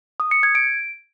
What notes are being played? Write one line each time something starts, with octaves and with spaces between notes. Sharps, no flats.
D#6
C#7
G#6
D7